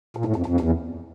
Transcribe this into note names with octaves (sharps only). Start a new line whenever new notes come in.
A#2
A2
F2
F2
E2